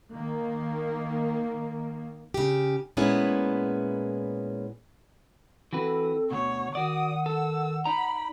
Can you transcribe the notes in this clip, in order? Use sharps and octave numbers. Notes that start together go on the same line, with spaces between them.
D#3 A#3
C#3 G4
A#2 G#3 B3 C#4 E4 G#4
E3 C4 F#4 A4 B4
D2 B2 C#5 F#5
D#3 F#4 D5 D#6
A4 E6
D#4 D5 A#5 B5